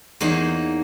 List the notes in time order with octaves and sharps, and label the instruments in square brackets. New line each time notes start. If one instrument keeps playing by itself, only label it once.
[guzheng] E2 A#3 D#4 C#5